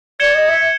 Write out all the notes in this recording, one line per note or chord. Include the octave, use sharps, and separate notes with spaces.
D5 G#6 C#7 E7 G7
D#5
E5